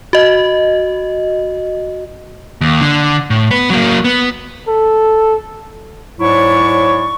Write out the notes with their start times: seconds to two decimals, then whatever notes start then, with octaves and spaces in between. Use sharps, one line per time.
0.13 F#4 D#5
2.61 D#2
2.81 D3
3.30 A2
3.51 B3 B4
3.70 F#3 A#3
4.04 B3
4.68 A4
6.20 G#2 F#3 E4 C#5 D5 C#6